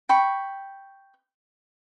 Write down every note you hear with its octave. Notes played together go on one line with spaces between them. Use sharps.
G5 B5 C#6